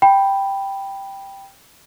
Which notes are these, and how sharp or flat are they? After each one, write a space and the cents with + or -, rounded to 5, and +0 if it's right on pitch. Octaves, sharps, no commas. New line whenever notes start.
G5 +0 B5 +0